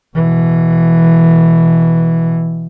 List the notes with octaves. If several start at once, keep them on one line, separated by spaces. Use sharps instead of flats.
B2 E3